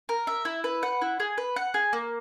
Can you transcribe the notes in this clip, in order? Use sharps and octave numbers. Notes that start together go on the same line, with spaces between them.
A#4
E5
E4
B4
F#5
E4
G#4
B4
F#5
G#4
A#3